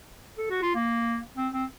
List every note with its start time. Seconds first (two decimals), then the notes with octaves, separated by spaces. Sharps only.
0.38 A4
0.50 F#4
0.62 F4
0.75 A#3
1.37 C4
1.53 C4